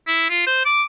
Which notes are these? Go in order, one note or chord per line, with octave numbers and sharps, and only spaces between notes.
E4
F4
C5
D6